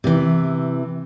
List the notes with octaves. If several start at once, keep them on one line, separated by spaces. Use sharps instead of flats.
C3 E3